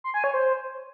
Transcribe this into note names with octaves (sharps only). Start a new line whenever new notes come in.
C6
G#5
C#5
C5